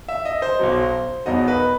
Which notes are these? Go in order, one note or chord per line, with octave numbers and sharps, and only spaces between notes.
E5
D#5
C5
B1 B2 F#3
E2 B2 F#3 B3 D#4 D#5
B4